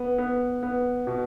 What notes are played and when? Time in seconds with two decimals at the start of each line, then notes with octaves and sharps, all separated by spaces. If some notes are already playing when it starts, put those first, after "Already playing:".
Already playing: B3
0.18 B3
0.63 B3
1.07 B2